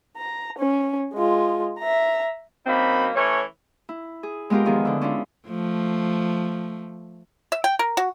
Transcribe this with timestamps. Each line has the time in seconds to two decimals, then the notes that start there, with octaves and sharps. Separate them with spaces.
0.17 A#5
0.58 C#4
1.14 G#3 F4
1.79 E5 A#5
2.67 F#2 F#3 A#3 C4 D#4 B5
3.15 E3 A3 C#4 C#5
3.89 E4
4.23 G#4
4.50 G#3 B3 F4 G4 A#4
4.65 E2 D#3 F3 B3 G#4
4.85 D3 E4
5.01 C#4 D4 E4 F4
5.47 F3 A3
7.52 E5
7.64 G5
7.79 A#4
7.97 F#4